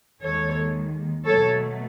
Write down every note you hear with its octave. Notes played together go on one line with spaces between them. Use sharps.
D#2 D#3 G#3 A4 C#5
B2 F#3 A3 A4 C#5